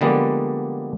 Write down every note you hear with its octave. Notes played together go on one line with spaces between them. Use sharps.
D3 F3 G3 G#3 A#3 B3